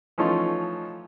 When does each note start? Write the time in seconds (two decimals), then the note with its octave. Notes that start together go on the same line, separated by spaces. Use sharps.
0.18 E3 F3 A3 C#4 D#4 F4